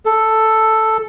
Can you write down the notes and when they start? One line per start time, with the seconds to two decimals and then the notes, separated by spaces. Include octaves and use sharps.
0.06 A4